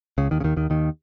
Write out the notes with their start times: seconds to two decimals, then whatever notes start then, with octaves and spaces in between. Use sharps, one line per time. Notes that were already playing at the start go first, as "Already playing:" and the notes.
0.18 C#2 C#3
0.31 D#2 D#3
0.40 C#3
0.44 D#2 D#3
0.57 D#2 D#3
0.70 D#2 D#3